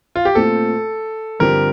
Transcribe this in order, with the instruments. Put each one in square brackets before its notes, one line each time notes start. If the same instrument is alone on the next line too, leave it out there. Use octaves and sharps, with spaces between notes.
[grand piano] F4
G4
[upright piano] A#2 A3 C4 F4 [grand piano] A4
[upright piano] G2 D3 F3 C4 G4 [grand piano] A#4